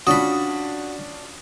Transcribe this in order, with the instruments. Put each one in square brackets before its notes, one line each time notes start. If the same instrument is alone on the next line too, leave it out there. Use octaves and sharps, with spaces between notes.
[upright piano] C#4 D4 F4 [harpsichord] F#4 B5 [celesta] D#6